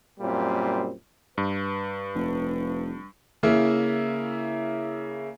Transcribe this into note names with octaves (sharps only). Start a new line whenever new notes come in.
F#2 A#2 G3 A#3 C4
G2 B4
F1
C#3 A#3 E4